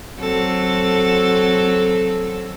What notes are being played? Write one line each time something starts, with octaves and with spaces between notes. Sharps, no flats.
F#3 C4 A4